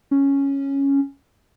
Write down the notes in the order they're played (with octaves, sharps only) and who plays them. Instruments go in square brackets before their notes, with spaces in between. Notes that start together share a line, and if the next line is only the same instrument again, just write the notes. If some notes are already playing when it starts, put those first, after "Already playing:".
[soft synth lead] C#4